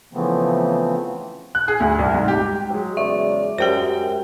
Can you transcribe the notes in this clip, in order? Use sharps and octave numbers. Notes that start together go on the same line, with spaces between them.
C#3 E3 F3 A3 B3 C4
F#6
G#4
D2
C2
G#2
G4
F#3 G#3
E2 C#3 D5 E5
F#2 G#3 G4 C5 G5 G7